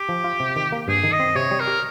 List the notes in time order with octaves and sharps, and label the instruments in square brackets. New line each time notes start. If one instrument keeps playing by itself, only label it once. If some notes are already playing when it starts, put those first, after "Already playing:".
Already playing: [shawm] G4
[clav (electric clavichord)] F3
F4
C3
D#3
A#3
[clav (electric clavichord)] G2 [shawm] G#4
[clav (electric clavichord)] D#3
[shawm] D#5
[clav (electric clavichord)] C4
[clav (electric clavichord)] C3 [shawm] C#5
[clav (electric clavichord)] G3
[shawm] A#4
[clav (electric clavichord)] G4